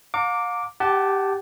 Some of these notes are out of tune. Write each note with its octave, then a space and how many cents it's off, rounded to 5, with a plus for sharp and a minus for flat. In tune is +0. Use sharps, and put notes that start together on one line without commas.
F5 +40 A#5 -35 D6 -5
G4 +0 F#5 +30 A5 -10